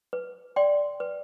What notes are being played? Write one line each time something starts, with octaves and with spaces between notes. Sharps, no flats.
B4
D5 G5 C6
B4